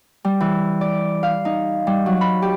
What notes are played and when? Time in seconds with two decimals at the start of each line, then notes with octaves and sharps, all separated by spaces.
0.24 G3
0.40 E3
0.81 D5
1.23 F5
1.45 D#4
1.87 G3
2.06 F#3
2.21 B5
2.42 G4